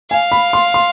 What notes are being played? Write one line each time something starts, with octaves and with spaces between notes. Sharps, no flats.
F5 G#5
B5
C6
C6